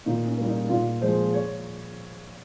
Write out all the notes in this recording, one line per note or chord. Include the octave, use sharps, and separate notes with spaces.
A#2 D#4
C#4
G3 A#3
D#4
A#2 F4
F3 G#3 C5
C#5